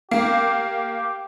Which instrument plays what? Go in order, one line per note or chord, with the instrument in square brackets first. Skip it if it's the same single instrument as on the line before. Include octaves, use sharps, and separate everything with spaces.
[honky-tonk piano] A#3 [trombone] G4